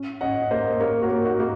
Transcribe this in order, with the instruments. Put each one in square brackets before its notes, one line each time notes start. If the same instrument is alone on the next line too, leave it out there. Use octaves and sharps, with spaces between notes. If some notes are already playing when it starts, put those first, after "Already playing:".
Already playing: [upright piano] C#4
[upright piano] C#4 [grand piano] D#5 F#5
[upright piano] A#3 [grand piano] C5 D#5
[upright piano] A#3 [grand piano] A#4 C#5
[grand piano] F#4 A#4
[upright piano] A#3
[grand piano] D#4 F#4
[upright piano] A#3